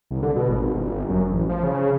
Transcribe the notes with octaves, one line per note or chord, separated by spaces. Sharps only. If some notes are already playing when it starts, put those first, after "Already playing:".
C2
D3
B2
G#1
G1
F#2
A1
F3
C#3